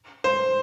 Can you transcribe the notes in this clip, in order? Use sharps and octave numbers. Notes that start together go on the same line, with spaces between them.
C5